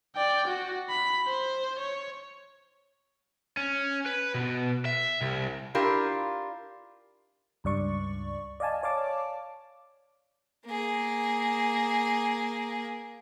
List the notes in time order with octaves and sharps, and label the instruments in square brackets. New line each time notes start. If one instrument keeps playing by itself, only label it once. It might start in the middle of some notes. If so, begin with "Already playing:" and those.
[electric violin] D5 G5
F#4
B5
C5
C#5
[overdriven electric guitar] C#4
B4
B2
E5
C2
[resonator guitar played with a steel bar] D4 E4 F4 G4 A#4
[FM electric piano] C#2 G2 D5 C#6
D5 D#5 F5 G#5 A5
C#5 D5 F5 A5 D6
[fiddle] A#3 G#4